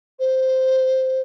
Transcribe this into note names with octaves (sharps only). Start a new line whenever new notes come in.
C5